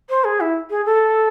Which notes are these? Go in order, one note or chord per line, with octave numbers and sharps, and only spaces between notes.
C5
G#4
E4
G#4
A4